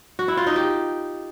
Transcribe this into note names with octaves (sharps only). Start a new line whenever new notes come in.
F#4
E4
F4
D#4
G4